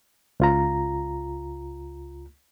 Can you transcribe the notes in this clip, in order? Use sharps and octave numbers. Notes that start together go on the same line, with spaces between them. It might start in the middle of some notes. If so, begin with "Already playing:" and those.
C#2 F4 A#5